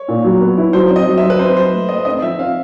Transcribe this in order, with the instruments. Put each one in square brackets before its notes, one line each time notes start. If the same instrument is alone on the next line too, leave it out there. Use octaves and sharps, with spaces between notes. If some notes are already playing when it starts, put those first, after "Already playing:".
Already playing: [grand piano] C#5
[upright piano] A#2
F#3
B3
E4
[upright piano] F#3 [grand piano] C5
[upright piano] C4
[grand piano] D#5
[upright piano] F#3
[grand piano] E5
[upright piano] F#3
[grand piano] B4
[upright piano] C4 [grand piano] C5
[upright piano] F#3 [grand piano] C5
[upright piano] A3
[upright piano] A3 [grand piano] D#5
[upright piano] C4 [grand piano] D#5
[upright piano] F3 [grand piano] E5
[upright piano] C4 [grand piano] F5